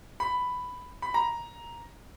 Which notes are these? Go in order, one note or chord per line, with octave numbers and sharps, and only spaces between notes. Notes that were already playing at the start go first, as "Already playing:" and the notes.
B5
B5
A#5